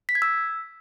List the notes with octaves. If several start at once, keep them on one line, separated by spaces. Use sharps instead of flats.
B6
G#6
E6